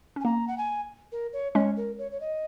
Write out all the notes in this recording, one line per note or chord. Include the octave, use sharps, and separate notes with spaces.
C#4
G#5
A#3 A#5
F#5
G#5
A#4
C#5
G#3 C#4 C#5
A#4
C#5
C#5
D#5